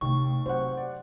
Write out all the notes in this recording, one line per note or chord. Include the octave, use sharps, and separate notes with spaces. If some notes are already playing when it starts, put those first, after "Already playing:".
D#2 C3 D#3 A3 C#6
C3 F#3 C#4 C5 F#5
D5